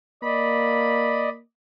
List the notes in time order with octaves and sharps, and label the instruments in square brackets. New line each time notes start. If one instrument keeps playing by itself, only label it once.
[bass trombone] A#3 [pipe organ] D5 D#5 [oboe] B5